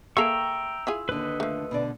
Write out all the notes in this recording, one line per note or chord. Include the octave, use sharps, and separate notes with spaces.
A#3 G#4 A4 E5 G5 A#5 C#6 E6
E4 F4 G#4
D#2 D3 B4 D#5
F3 A3
B2 D3 D5